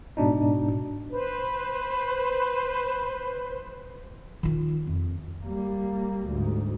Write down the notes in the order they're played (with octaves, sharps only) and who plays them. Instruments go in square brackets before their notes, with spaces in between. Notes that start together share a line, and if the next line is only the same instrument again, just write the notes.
[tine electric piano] G#2 B2 D4 D#4
[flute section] B4 C5
[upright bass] D#3 F4
F2
[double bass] G3 A#3
D2 G#2